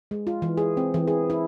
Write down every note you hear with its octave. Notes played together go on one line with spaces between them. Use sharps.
G#3
F4
E3
G#4
C4
E3
G#4
E4